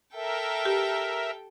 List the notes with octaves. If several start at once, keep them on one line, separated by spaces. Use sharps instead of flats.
A4 A#4 E5 G5
G4